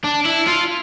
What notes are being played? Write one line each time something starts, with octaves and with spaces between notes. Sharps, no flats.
D4
E4
F4